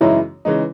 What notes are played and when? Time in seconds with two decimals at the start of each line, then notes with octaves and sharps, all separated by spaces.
0.01 F#2 C#3 E3 G#3 D#4 E4
0.45 C#3 E3 G#3 D#4